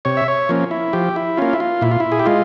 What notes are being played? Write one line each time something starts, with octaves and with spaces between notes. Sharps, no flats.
C3 C#5
E5
C#5
F3 A#3 C#4
E4
F3 G4
E4
A#3 C#4 F4
E4
F4
A#2 E4
F4
E4
G#4
G4
G#3 F4